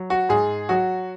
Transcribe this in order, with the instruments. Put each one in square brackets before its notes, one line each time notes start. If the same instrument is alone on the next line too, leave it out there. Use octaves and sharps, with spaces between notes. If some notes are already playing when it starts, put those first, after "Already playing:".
Already playing: [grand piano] F#3
F#4
G#2 G#4
F#3 F#4